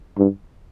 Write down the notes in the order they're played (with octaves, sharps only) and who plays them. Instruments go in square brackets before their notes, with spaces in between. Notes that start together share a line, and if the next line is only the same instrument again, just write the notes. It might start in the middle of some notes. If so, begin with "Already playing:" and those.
[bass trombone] G2